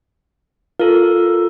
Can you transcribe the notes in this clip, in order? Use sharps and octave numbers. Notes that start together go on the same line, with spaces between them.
F4 A4 A#4